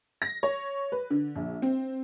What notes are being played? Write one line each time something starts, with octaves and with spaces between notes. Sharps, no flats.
A#6
C#5
B4
D3
A#1
C4